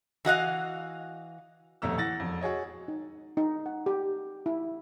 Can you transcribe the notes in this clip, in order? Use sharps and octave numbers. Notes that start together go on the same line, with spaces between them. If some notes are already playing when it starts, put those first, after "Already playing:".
E3 F#4 D#5 F5
D#1 F2 B2 A3 A#5 E6
E3 F#5 A6 A#6
E1 F2
F#4 G#4 C#5 D#5
D#4
D#4
F#5
G4
E4